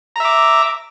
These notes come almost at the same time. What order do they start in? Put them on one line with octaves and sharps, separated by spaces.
A#5 E5 D6